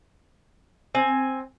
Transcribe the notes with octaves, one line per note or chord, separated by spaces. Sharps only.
C4 G#5